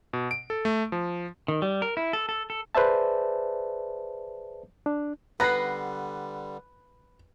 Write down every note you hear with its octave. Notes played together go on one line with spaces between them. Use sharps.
B2
D7
A4
A3
F3
D#3
G3
A#4
E4
A4
A4
A4
G#4 B4 C5 D5 E5 A5
D4
D3 G3 B3 B4 A#5 F#6 A#6 C7